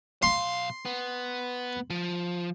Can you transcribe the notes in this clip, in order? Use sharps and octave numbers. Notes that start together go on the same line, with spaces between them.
B1 F5 C6
B3
F3